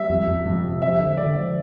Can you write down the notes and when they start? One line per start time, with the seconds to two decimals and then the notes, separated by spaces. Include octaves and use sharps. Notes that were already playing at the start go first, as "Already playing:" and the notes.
Already playing: G3 E5
0.09 F2
0.27 F2
0.45 F2
0.64 C3
0.81 F3 E5
0.99 D3
1.17 D3 D5
1.35 F3